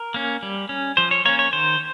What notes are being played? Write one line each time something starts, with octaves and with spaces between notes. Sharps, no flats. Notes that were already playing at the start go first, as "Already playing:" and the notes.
Already playing: A#4
A#3 C#4
G3
C#4
F3 C5
C#5
A#3 C#4 C#5
C#5
D#3 C5